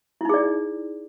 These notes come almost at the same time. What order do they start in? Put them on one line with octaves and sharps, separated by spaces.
E4 D#4 G#4 D5